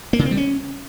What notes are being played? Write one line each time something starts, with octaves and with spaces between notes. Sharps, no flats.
A#3
C#3
C4
G3
C#4